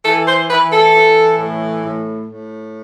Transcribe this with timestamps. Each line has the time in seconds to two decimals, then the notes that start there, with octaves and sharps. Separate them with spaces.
0.05 E3 A4
0.28 C5
0.50 E3 B4
0.72 A4
0.95 E3
1.38 A2
1.84 A2
2.28 A2